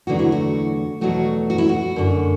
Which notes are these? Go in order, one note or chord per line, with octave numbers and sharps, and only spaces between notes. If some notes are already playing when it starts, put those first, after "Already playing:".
E2 D3 F#3 A3 F#4
E4
F#4
E2 B2 F#3 A3 F#4
F#4
E4
F#4
F#2 D3 A3